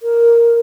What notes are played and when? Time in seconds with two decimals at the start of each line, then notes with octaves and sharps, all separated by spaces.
0.03 A#4